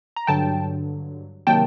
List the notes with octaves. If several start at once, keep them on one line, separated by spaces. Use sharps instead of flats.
A#5
G2 D3 F#3 G5 A5
C3 D#3 F#3 A#3 G5 A5